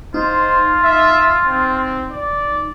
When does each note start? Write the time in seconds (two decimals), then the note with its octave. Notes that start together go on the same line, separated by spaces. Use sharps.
0.14 D#4 F4 C5
0.83 E5
1.44 C4
2.11 D5